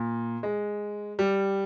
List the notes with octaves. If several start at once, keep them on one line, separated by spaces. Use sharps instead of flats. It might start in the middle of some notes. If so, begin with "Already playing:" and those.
Already playing: A#2
G#3
G3